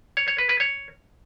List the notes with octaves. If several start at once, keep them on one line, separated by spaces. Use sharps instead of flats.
C#5
C#5
B4
B4
C#5